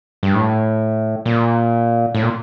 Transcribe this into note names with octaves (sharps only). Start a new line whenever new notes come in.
G2
A2
A#2
A2
A#2